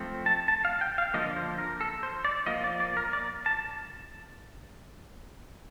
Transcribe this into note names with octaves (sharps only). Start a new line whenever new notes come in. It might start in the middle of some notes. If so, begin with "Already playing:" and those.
Already playing: F3 A3 C4
A5
A5
F5
G5
F5
D3 F3 A#3 D#5
C5
A#4
A4
C5
D5
F3 A#3 D#5
D5
D5
A#4
D5
A5